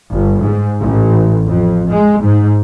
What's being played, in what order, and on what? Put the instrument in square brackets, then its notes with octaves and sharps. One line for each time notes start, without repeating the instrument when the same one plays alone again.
[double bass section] G1
G#2
A1
F2
G#3
G#2